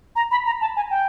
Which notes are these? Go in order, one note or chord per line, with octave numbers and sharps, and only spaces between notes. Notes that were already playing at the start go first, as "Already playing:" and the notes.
A#5
B5
A#5
A5
G#5
G5